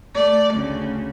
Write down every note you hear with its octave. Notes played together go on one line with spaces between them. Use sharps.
A3 D5
D2 C#3